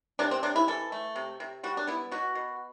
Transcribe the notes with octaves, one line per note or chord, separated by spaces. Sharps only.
C3 D4
C4
C3 D4
E4
E3 A4
A3
C3
C3
G3 F#4
D4
B3 E4
B2 F#4
B2